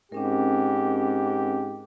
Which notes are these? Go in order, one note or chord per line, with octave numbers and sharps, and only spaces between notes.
G#2 C4 C#4 G4 A#4